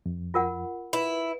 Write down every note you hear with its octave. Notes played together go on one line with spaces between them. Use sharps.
F2
F4 A#4 F#5
E4 B4